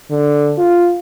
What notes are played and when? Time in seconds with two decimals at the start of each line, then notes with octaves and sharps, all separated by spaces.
0.11 D3
0.58 F4